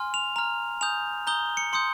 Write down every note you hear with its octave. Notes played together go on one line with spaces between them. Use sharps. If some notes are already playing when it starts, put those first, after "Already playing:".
Already playing: G#5 C6 F6
F7
A#5 F6 F7
G#5 D#6 G6 F7
A#5 D#6 G6 G7
C#7
C6 D#6 G6 C#7